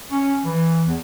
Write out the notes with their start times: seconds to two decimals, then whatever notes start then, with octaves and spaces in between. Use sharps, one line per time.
0.11 C#4
0.44 E3
0.86 E2